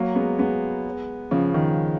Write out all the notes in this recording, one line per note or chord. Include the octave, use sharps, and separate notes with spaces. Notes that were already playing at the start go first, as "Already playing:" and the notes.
Already playing: F#3 A#3
G#3 B3
G#3 B3
C#3 F3
D#3